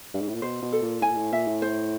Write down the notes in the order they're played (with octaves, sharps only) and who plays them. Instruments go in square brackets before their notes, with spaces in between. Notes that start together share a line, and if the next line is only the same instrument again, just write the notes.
[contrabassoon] G2
G#2
A2
A#2
[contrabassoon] B2 [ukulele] C5
[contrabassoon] B2
[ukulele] A4
[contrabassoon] A#2
[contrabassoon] A2 [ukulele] G#5
[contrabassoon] A#2
A2
[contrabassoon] A#2 [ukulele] E5
[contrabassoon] A2
[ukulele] C5